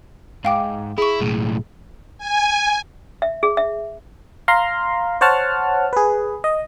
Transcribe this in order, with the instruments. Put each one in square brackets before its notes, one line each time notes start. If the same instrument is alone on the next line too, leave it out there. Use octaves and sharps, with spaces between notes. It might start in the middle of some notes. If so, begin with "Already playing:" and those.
[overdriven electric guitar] G#2 [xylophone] F5 G5 D6
[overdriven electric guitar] E4 [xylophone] G#4 C#6
[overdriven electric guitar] B1 A2
[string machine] G#5
[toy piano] E5
G#4
E5
[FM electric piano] F5 A#5 C6
C5 C#5 F#5 A5 F6
G#4 B4
D#5